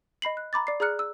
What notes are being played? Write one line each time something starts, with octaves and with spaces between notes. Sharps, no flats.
D#5 B5 C7 F#7
F#6
A#5 B5 D6 A6
D5 D6 C7
G#4 D5 A#5 F6 F#6 C#7
E6